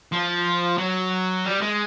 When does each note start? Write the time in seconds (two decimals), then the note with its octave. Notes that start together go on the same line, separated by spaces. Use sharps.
0.12 F3
0.78 F#3
1.45 G3
1.61 G#3